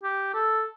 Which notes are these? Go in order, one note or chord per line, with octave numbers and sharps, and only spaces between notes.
G4
A4